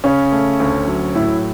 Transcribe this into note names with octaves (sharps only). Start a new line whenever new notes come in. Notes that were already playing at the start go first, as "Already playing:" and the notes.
C#3 C#4
A3
D2
F#3
A2 E4